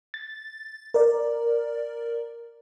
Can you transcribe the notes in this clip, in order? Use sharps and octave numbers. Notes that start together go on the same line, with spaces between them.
A6
A#4 D5